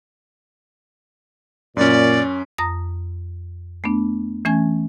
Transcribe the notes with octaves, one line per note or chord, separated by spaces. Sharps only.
F#2 A#2 C#4 D5
F2 A#5 D#6 A#6
A3 B3 D4
E3 A3 C#4 G#5 G#6